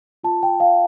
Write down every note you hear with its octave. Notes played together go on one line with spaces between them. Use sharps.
F4 A5
G5
F4
F5